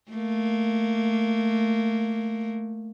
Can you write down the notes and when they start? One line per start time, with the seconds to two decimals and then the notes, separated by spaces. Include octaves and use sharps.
0.11 A3 A#3